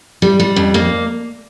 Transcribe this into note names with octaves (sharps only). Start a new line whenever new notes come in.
G3
G3
F2
A#3